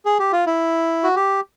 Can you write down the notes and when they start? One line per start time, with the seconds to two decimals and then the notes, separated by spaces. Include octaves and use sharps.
0.05 G#4
0.19 G4
0.32 F4
0.46 E4
1.04 F#4
1.16 G4